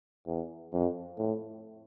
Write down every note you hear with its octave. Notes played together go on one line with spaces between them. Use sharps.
E2
F2
A2